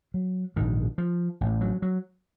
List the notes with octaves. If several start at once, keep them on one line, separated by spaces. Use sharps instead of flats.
F#3
A#1 G#2 D#3
F3
A1 A2
F#3
F#3